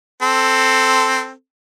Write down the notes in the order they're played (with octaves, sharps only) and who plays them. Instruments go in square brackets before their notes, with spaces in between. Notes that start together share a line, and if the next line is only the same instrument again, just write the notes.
[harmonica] C4 A4